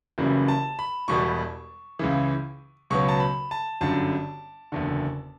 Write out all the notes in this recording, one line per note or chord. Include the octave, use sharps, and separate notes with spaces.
F#1 F#2 C#3 E3 G3
A5
B5
E1 E2 B2 G3 C#6
C#2 C#3 E3
C#2 B2 F#3 B3 C#6
A5
B5
A5
G1 F#2 D3 G3 A5
F#1 E2 D3